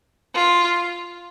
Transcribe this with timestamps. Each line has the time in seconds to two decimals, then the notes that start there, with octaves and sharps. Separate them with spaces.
0.35 F4